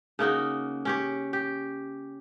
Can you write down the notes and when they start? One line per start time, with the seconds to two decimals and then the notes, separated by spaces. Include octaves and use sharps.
0.19 C#3 A#3 D#4 F#4
0.85 C#4 G4 C#5
1.33 G4